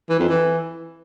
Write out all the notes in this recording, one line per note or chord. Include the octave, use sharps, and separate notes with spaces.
E3
F2
E3